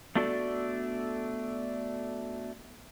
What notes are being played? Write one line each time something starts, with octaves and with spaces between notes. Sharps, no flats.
A3 B3 D4 F#4 A4 D5